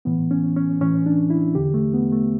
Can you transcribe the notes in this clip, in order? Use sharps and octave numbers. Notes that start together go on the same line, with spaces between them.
A2 E3 B3
C#4
C#4
A2 E3 C#4
D4
E4
E2 D3 G4
A3
B3
A3